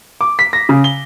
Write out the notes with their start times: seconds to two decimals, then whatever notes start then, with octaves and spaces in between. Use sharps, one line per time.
0.21 D6
0.39 B6
0.53 A#6
0.69 C#3
0.84 G7